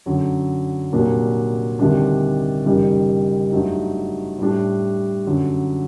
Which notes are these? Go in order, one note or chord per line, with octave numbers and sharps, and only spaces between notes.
F#2 D3 F#3
C2 A#2 F#3 A#3 D4
D2 C3 D#3 G3 D4
F#1 F#2 D#3 G3
G2 F#3 A3 D#4
A2 G3 D4
F#2 D3 F#3